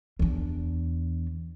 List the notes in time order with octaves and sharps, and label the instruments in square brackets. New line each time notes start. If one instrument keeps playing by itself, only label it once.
[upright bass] E2 D4